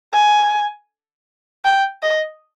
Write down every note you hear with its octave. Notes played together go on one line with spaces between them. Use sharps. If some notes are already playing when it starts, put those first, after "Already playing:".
G#5
G5
D#5